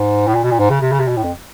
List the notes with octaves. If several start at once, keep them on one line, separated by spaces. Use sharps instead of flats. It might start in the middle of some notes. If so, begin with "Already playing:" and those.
Already playing: G#2
A2
A#2
B2
A#2
G#2
C#3
C3
C#3
C3
B2
A2
F2